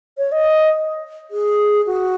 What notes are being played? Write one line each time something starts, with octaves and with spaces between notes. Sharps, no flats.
C#5
D#5
G#4
F#4